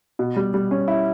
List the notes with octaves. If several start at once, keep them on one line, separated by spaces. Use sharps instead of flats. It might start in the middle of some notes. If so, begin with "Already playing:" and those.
B2
G3
G3
C#4
E4